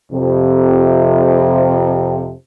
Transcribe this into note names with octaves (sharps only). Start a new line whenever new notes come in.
F2 C3